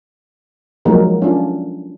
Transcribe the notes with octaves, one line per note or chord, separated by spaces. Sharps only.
F3 F#3 G#3 A#3 D#4 A#4
C#4 D4 F4